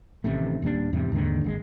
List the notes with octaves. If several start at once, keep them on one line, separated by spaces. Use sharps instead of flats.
A1 C3 D#3 A3
D#1 A#2 G3 D4
E2 G#2 C3 G3
D#2 G#2 D3 D#3
G#1 D3 G#3